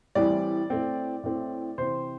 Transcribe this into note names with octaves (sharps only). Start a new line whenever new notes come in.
A2 E3 G3 C4 D5
A2 A3 C4
A2 A3 C4
C3 E3 C4 C5